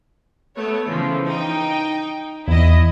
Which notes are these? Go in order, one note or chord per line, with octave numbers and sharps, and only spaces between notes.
A3 B3 C#5
C#3 E3 F3
D#4 G5
E2 E4 D#5